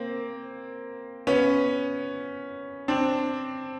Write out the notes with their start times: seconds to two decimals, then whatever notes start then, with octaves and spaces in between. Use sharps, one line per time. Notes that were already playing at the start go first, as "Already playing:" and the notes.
Already playing: A#3 C4
1.27 B3 C#4
2.88 C4 D4